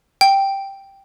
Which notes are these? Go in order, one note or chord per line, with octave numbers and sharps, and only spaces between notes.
G5